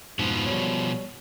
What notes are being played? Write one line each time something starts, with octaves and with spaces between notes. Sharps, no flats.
F2 G#2 B2 F3
G3 C#5